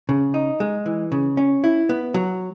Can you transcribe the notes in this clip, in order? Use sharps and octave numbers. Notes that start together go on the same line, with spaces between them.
C#3
D#4
G#3
E3
C#3
C#4
E4
B3
F#3